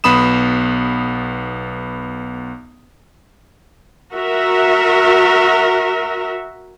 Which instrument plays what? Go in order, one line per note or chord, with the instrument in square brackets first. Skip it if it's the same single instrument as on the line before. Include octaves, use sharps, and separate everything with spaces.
[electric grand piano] B1 B3 B5 D#6 E7
[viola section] F#4 A#4 E5